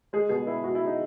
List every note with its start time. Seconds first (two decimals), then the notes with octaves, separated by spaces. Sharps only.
0.13 G#3 G#4
0.29 B2 G#4
0.46 B2 E4
0.64 G#3 F#4
0.75 E4
0.81 G#3
0.86 D#4